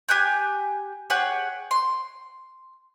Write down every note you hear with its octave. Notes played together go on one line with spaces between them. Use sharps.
G4 G#5 F#6 G6
G4 G#4 C#5 F#5
C6